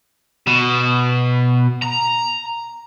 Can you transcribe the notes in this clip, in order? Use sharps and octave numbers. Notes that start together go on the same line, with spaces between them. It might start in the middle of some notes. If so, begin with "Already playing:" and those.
B2
A#5